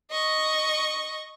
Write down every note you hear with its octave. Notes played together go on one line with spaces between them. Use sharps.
D#5 C#6